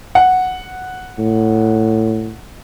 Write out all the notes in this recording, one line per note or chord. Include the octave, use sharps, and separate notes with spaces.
F#5
A2